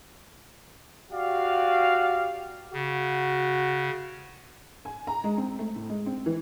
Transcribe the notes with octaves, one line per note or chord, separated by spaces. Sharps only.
F#4 G4 D5 F5
C#3 F#4
G#5
A#5
G#3
C4
A3
A2
G#3
C4
E3